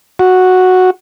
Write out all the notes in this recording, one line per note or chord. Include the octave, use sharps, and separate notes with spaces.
F#4